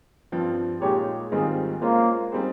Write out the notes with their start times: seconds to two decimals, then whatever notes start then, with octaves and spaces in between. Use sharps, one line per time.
0.32 G2 F3 C4 F4
0.81 A#2 G#3 D#4 G4 G#4 C#5
1.32 G#2 D#3 G3 C4 F4 G#4
1.81 G#3 A#3 C#4 F4 C5
2.32 G3 C4 D#4 G#4 C5